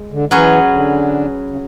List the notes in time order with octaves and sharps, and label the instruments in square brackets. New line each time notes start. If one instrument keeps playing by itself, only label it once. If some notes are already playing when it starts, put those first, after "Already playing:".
Already playing: [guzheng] G#3
[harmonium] D3
[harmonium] E3 [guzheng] F#3 C#4 G#4 B4
[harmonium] D3
C#3